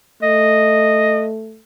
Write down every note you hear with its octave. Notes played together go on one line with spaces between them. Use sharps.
A3 D#5